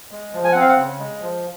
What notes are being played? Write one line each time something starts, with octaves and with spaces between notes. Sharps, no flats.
G#3
F3
G#5
C4 F#5
F5
F#5
C#3
G#3
F3